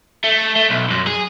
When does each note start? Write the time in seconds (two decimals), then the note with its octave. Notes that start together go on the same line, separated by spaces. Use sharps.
0.24 A3
0.56 A3
0.70 B1
0.90 F#2
1.07 G#4